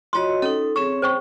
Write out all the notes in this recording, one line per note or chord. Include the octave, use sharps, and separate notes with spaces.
F4 F#4 C#5 D#5 C6
C#4 D#4 A4
C4 G#4 C#5 C#6
C5 G5 C#6